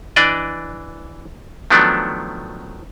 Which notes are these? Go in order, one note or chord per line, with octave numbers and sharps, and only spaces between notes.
E3 D4 D5 D#5
D#3 F3 F#3 A3 B3 D4